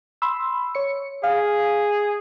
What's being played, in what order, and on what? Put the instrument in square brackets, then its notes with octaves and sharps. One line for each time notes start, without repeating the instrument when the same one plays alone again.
[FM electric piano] B5 C6 E6
C#5 C#7
[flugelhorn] G#4 [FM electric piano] F5